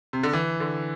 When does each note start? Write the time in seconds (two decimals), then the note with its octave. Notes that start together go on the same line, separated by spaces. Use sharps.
0.13 C3
0.23 D3
0.33 E3
0.60 D3